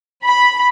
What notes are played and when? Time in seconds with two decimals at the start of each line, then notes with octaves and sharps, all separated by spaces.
0.23 B5